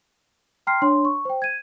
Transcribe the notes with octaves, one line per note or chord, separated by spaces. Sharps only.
G5 A#5 C6 F6 C7
D4 C#5 C6
C#6
C5 G5
G#6 D#7